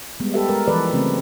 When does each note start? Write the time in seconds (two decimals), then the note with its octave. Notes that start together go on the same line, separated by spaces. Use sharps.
0.20 G3 G#3 B3
0.34 G4 A4 B4 E5
0.49 G#3 A#4
0.67 E3 F3 A4 B4 D5
0.93 C#3 F#3 A3 C4